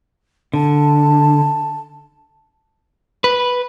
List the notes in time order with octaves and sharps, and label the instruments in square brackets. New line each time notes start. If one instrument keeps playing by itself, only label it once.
[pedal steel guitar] D3 [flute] A5
[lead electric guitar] B4